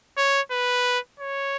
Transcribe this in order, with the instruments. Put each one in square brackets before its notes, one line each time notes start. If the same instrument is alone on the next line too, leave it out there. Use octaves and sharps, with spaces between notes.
[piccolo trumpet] C#5
B4
C#5